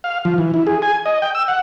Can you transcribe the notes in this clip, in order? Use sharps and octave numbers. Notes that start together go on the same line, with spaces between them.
F5
F3
E3
E4
G#4
G#5
D#5
G5
E6
F#5